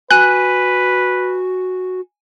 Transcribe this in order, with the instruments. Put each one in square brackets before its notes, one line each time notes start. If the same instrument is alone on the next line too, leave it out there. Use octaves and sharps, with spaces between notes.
[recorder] F#4 [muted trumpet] B4 [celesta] G#5 D#7 [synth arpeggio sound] F#6